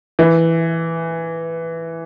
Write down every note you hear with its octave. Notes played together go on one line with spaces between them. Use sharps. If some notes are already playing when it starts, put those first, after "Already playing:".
E3